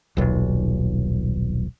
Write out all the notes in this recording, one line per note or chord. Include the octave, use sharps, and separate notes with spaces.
D#1 B1